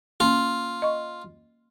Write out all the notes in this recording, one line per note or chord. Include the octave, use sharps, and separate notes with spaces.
A#3 C#4 F4
D#5 C#6